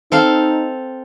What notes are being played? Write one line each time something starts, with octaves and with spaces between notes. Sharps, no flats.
C4 D#4 A4 F5